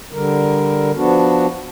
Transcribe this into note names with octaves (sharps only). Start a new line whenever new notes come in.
D3 G3 A#4
F3 B3 D4 F#4